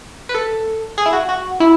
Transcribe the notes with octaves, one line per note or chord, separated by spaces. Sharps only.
B4
A4
G#4
E4
F#4
F#4
E4